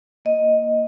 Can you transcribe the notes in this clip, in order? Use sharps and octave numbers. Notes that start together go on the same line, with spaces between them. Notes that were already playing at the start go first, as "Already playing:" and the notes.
A#3 D#5